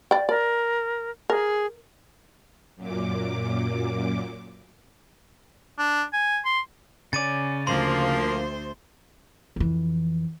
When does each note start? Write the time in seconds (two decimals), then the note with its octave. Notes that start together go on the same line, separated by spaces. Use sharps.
0.11 D5 G5
0.29 A#4 D5
1.30 G#4 A#4
2.76 F#2 A#2 D6
5.78 D4
6.13 G#5
6.45 C6
7.13 C#3 C#4 D5 A6 D#7
7.67 D2 F3 A#3 C5 C6
9.56 F2 E3